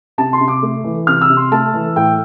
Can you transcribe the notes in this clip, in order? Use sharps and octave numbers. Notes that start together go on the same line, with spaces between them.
C3 A5
C6
C3
D6
A3
E3
C3 F6
E6
C3
C6
A3 A5
E3
A2 G5